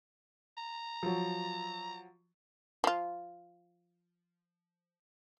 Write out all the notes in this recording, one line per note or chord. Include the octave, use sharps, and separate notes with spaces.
A#5
F3 F#3
F3 F4